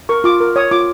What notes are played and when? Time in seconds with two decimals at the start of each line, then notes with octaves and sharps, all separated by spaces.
0.09 A#4 C#6
0.24 F4 D6
0.41 A#4
0.56 C#5 D#6
0.71 F4 D6